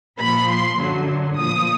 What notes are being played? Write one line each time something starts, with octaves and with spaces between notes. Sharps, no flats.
A#2 F3 B5
C6
F#2 D3 F#3
A#2 F3 D#6